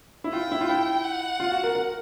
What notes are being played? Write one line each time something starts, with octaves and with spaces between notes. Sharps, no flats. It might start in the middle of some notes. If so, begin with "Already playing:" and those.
E4
F4 G5
E4
F4
E4
F#5
F4
F#4
A#4
A#4